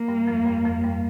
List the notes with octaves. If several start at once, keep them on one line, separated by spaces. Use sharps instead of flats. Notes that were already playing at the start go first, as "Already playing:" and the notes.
Already playing: A#3
G2 G3
F2 F3
G2 G3
F2 F3
G2 G3